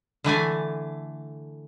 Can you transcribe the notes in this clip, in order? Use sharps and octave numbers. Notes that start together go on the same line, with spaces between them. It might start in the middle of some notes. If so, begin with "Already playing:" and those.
D3 E3 A3 G#5